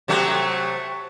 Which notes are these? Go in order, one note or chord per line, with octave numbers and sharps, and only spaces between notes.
C3 F#3 A3